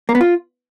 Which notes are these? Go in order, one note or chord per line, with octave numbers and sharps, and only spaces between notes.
A#3
B3
F4